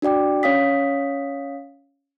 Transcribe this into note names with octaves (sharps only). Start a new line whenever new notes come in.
D4 F#4 D5 G5 D6
C#4 C#5 F5 D#6 B6